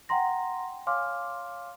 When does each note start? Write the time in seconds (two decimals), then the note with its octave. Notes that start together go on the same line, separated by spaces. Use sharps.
0.09 F#5 G5 A#5 C6 A#6
0.86 C#5 F5 G#5 C6 D6 F6